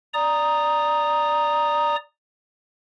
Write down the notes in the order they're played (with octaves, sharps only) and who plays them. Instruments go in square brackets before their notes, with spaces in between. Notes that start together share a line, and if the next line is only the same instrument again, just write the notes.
[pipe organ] D5 A#5 D#6